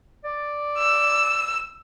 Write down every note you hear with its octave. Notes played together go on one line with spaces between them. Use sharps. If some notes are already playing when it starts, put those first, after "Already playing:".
D5
E6